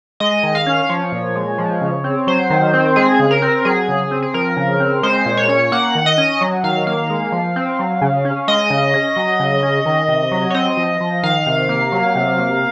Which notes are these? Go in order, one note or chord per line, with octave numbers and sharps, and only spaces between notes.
G#3 D#5
D#3
F5
C#4
F3 C#5
A#2
G#3
F3
C#3
C4
F#3 C5
D#3
C4
G#3 G#4
C#3
A#4
C4
F#3 G#4
C#3
C4
G#4
F3 A#4
C#3
C4
G#3 C5
A#2
C#5
C#4
A#3 F#5
D#3
D#5
C#4
F#3
D#3 F5
A#3 F5
G#3
F3
C4
F#3
C#3
C#4
G#3 D#5
C#3
C#4
F#3
C#3
C#4
D#3
C3
F#3
C#5
C4 D#5
F3
F3
D#3 F5
C3
A#3
F#3
C3
A#3